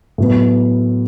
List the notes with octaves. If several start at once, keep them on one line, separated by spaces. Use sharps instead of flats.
A2 F#3 B3